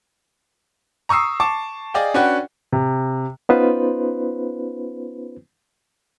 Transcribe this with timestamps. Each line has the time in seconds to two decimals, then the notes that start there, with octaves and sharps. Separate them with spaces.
1.09 A#5 C#6 D#6 E6 C7
1.40 A5 C#6 D6
1.94 G#4 D5 D#5 F5 G5
2.14 C#4 D4 F#4 B4 F#5 G5
2.72 C3
3.49 B3 C#4 D#4 F4 B4 C5